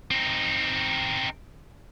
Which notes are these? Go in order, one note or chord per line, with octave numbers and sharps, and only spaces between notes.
C4 D#4